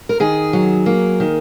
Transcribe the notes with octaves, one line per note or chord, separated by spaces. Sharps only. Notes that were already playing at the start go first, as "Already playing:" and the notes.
A#4
D#3 G#4
F#3
A#3
D#3